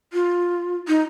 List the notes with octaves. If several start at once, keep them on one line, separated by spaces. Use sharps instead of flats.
F4
D#4